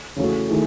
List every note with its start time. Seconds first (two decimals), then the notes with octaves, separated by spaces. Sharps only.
0.16 C#3 E3 A3 C#4 F#4
0.48 D#3 A3 E4 G#4